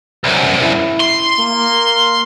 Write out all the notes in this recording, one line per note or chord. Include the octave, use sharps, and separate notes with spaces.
C2 F#2
E4
C6
A#3